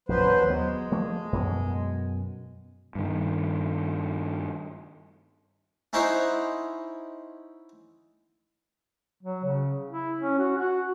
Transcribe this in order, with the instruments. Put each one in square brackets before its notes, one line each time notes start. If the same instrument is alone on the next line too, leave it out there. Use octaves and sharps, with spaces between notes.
[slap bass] A#1 F#2 F3 [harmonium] F#3 B4 C5
[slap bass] D#2
[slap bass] F#3 B3 [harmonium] G#3
[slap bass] F3 A3 A#3
F#2 B2
[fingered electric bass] G2 D#3
[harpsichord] C#4 D#4 E4 C5 C#5 F#5
[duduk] F#3
C#3
E4
C#4
F#4
F#4